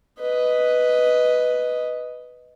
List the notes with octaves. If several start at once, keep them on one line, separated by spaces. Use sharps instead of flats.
B4 D#5